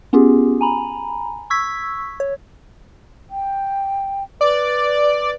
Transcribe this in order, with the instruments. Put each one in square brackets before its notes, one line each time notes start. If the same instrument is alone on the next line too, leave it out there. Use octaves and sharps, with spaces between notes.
[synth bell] B3 C#4 F4 G4 G#4
G#5 A#5 B5
C#6 E6 G#6 B6
C#5
[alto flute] G5
[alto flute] B4 [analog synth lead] D5